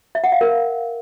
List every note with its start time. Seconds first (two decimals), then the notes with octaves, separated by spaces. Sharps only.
0.15 E5
0.24 F#5
0.32 F5
0.41 A#4